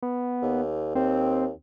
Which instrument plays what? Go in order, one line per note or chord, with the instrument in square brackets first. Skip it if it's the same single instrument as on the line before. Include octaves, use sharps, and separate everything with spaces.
[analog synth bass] B3
[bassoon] D#2
[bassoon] D#2 [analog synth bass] C4